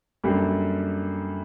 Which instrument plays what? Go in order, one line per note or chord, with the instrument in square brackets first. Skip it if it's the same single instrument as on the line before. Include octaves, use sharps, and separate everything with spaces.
[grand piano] F#2 D3 G3 A#3